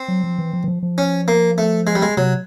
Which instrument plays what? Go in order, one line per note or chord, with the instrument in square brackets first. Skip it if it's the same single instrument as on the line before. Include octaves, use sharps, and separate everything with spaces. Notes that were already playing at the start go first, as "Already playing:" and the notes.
Already playing: [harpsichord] C4
[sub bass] F#3
F3
E3
F3
E3
F3
F3
[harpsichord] C#4
A#3
A3
G#3
G3
G#3
[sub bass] C3 [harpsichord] F#3